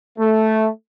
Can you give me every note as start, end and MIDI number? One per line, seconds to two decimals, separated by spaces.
0.19 0.69 57